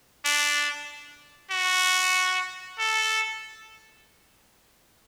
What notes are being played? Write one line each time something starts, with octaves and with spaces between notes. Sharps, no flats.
D4
F#4
A4